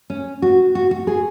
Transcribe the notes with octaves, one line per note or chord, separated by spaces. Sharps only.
C#4
F#4
F#4
F#4
G#4